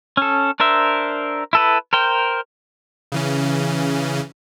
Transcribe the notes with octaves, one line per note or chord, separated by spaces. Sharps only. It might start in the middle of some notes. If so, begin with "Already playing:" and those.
C#4 A4
D4 A#4 C5 E5
E4 A4 B4
A#4 C5 G5
C#3 E3 C#4